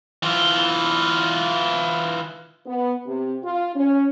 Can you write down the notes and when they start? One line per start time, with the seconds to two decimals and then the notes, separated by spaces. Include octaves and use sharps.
0.23 E3 F4
2.66 B3
3.06 C3
3.43 F4
3.75 C#4